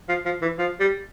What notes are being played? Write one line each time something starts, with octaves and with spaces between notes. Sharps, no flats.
F3
F3
E3
F3
G3